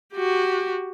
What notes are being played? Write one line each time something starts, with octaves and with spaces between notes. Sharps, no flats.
F#4 G4